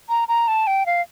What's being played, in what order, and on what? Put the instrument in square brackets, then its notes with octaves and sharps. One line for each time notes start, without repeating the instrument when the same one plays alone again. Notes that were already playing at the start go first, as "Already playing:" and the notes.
[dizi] A#5
A#5
A5
G5
F5